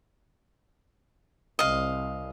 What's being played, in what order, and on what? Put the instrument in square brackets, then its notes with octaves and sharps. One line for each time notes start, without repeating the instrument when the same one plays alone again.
[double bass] C2 C3 [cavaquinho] D#5 F5